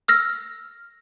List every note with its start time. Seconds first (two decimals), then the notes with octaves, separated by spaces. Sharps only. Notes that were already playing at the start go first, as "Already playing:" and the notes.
0.08 E6 F6 A#6